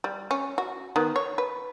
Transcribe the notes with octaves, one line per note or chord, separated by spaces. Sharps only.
G3
C#4
F#4
D#3 B3
C#5
B4